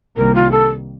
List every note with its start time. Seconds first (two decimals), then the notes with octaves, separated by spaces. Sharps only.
0.17 C2 C3 D#3 G3 A#3 A#4
0.35 F4
0.51 A4